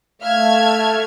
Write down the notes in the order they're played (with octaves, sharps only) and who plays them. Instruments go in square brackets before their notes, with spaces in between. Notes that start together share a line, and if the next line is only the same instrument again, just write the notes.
[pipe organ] A3 [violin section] E5 F6 G#6 [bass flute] F5